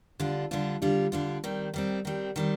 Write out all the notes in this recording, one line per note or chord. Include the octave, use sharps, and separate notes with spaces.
D3 G3 D4 F4
D3 G3 D4 F4
D3 G3 D4 F4
D3 G3 D4 F4
D#3 G3 C4
D#3 G3 C4
D#3 G3 C4
D#3 G3 C4